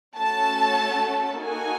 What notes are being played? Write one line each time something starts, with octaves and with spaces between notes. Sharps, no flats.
A3 C#4 F#4 A4 A5
A#3 D#4 F#4 A4 G#5